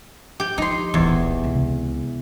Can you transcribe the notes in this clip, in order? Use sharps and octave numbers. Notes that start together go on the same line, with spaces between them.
G4 G5
F3 D#4 C6
D1 A#1 E2
C#2 C3